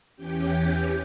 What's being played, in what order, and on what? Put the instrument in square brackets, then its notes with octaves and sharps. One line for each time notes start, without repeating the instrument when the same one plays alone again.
[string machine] E2 E3 C#4 G4 G5